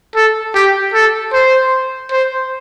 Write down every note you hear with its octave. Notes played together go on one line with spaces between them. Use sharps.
A4
G4
A4
C5
C5